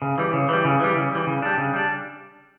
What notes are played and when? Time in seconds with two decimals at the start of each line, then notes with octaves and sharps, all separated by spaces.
0.02 C#3
0.18 E3 G3
0.33 C#3
0.49 E3 G3
0.65 C#3
0.80 E3 G3
0.96 C#3
1.12 E3 G3
1.27 C#3
1.42 G3 D4
1.58 C#3
1.73 G3 D4